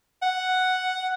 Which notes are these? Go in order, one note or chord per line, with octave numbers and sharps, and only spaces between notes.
F#5